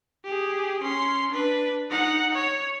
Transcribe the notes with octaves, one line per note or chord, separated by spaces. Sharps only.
G4 G#4
C#4 C6
D4 B4
D#4 F#5
C#5